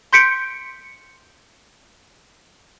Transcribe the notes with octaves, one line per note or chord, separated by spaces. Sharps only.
C6 G6 B6 C#7 D7